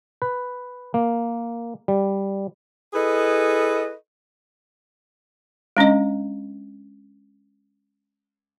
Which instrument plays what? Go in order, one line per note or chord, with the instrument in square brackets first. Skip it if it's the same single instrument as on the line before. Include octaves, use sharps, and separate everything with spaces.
[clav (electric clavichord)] B4
A#3
G3
[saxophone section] E4 G#4 A4 B4 D#5
[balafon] G#3 C#4 D4 D#5